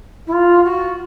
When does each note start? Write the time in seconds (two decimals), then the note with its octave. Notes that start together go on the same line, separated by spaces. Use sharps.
0.26 E4
0.32 F4
0.63 F#4